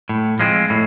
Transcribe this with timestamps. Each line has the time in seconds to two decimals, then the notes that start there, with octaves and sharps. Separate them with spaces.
0.09 A2
0.39 F3 G#3 C4
0.70 A2